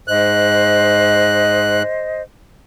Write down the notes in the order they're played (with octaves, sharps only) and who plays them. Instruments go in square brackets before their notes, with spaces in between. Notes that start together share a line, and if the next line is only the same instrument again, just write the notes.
[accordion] G#2 F#6 [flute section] C5 D#5